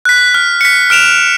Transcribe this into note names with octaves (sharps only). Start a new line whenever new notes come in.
F#6 B6
F6
B6 C#7
F6 D7 E7 F7